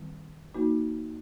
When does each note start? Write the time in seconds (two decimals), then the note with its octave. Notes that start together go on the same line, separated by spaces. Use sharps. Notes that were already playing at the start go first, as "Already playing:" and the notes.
Already playing: D#3 G3 C4 E4
0.54 A#3 D#4 F#4